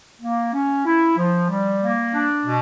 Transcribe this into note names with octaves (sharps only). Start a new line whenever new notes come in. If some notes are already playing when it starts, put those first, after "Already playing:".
A#3
C#4
E4
F3
G3
A#3
D4
B2